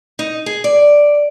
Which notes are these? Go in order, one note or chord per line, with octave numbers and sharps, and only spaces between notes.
D#4
G#4
D5